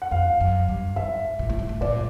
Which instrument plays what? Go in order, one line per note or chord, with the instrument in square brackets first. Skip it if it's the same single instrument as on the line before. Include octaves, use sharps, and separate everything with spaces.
[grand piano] F#5
[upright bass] F2 [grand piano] F5
[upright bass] F#2
G2
[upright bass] G#2 [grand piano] E5
[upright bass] A#2
A2
G#2
A2
[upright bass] A#2 [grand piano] D5